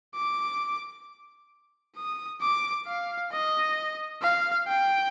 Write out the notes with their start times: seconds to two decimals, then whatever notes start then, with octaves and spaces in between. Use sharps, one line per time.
0.15 D6
1.96 D#6
2.41 D6
2.87 F5
3.32 D#5
4.22 F5
4.67 G5